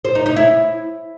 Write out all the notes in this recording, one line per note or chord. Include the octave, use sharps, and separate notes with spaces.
C5
D#4
D#4
E4